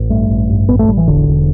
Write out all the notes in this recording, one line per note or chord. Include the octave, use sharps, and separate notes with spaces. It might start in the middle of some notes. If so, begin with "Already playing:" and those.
Already playing: A1
G2 A3
A1
G2
A1 B3
A3
A1 G3
E3
E1 D3
E1